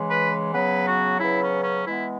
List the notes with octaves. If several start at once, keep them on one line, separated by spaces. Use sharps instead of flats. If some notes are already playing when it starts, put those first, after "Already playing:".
Already playing: C#3 E3 G#3
B4
C#3 F#3 B3 B4
F#4
C#3 F#3 B3 E4
C#4
C#4
E3 G#3 B3 E4